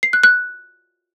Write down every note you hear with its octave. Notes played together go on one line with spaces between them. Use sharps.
C7
F#6
F#6